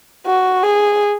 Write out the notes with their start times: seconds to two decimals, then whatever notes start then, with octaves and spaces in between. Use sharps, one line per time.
0.26 F#4
0.63 G#4